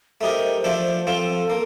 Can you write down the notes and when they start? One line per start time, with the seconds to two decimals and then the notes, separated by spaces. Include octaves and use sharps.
0.21 A3 D#4 G4 A#4 C5
0.64 F3 A3 D4 A4
1.07 F3 C4 F4 A4
1.50 A#3